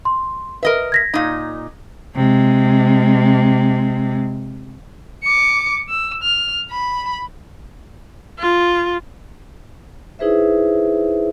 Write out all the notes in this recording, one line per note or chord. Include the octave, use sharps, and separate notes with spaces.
C6
A#4 B4 D#5 E5
G#6 A#6 B6
A#2 D#4
C3 G#3
D6 C#7
E6
F6
B5
F4
D#4 E4 G#4 B4 C5 E5